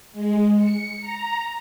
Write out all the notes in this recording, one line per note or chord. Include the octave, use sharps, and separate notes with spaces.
G#3
C#7
A#5